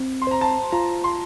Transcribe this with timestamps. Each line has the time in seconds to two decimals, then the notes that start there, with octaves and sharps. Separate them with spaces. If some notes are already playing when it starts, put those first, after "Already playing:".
Already playing: C4
0.22 C6
0.27 C5 A#5
0.41 A5
0.72 F4 A#5
1.04 C6